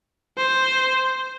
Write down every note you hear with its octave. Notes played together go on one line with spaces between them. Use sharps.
C5